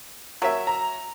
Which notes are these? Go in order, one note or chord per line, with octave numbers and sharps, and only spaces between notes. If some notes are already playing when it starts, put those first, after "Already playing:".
F#3 A#4 C#5 E5
A#5